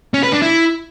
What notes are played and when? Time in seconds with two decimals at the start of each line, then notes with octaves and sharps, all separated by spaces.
0.14 C#4
0.23 B4
0.33 D4
0.42 E4